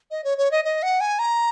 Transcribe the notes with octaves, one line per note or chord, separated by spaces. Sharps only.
D#5
C#5
C#5
D#5
D#5
F#5
G#5
A#5